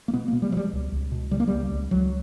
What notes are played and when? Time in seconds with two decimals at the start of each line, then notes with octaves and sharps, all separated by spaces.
0.08 A#3
0.13 B2 B3
0.28 A#3
0.33 B2
0.42 G3
0.52 B2 F#3 G3
0.73 C#2
0.92 C#2
1.12 B2
1.31 C#3 G3
1.40 A#3
1.48 C#2 G3
1.71 C#2
1.91 C#2 F#3